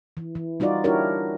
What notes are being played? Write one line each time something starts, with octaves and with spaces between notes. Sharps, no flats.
E3
E3
G3 D#4 F4 F#4 D5
D4 E4 F#4 G4 A#4 C#5